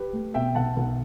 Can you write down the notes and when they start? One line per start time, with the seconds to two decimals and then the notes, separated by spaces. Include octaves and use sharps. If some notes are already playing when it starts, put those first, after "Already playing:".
Already playing: G4 B4
0.13 A3
0.34 B2 E5 G5
0.55 B1 F#5 A5
0.77 B1